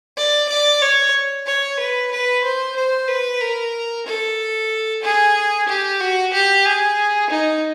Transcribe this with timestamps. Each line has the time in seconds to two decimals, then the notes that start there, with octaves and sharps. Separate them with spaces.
0.17 D5
0.49 D5
0.81 C#5
1.46 C#5
1.79 B4
2.11 B4
2.44 C5
2.76 C5
3.08 B4
3.41 A#4
4.06 A4
5.03 G#4
5.68 G4
6.00 F#4
6.33 G4
6.65 G#4
7.30 D#4